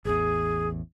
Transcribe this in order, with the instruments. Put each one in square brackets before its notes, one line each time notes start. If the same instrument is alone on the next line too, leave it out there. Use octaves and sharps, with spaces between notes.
[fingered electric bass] A1 E2 [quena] G#4